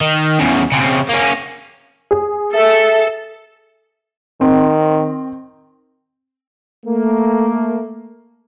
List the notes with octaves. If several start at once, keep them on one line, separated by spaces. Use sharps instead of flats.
D#3
E2 C#3
C#3 C4
A#3 C#4
G#4
A4 E5
D#3 C4
A3 A#3